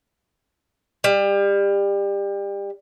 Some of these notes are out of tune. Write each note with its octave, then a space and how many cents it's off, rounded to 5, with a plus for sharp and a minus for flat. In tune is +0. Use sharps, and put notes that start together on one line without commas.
G3 +25